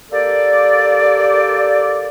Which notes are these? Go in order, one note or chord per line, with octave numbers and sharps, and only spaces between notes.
A#3 G4 A4 D5